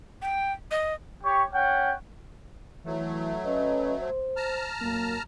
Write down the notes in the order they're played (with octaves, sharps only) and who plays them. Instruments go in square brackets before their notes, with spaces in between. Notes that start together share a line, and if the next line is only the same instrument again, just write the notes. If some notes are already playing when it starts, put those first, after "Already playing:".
[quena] G5
D#5
[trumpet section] G4 C#5 C#6
C#4 F#5 G5
[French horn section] E3 [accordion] F#3 A3
[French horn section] C#4 B4 D#5
C5
[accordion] A5 A#5 F6
[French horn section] F#2 A#3